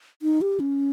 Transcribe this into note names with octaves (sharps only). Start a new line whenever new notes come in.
D#4
G4
C#4